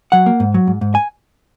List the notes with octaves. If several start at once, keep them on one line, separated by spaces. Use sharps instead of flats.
F#3 F#5
A#3
G#2
F#3
G#2
G#2
G#5